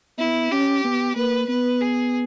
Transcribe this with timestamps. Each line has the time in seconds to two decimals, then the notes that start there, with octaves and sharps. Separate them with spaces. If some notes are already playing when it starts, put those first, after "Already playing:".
0.18 B3 E4
0.52 C#4 G4
0.85 B3
1.16 A#3 B4
1.49 B3 B4
1.81 G#4